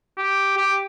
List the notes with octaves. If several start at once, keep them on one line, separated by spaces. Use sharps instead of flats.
G4
G4